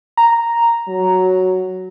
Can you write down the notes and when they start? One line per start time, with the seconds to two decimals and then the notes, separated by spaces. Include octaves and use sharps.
0.17 A#5
0.88 F#3